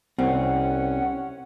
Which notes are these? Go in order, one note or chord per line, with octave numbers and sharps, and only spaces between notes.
C2 C4 C#4 F#5